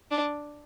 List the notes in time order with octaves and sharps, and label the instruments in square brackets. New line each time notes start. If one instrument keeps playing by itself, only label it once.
[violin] D4